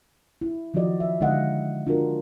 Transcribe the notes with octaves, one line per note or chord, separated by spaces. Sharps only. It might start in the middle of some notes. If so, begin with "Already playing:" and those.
E4
D#3 F3 F4 F#4 D5 D#5
E5
D3 G#3 D#4 D#5 F5 F#5
D4 F4 F#4 A#4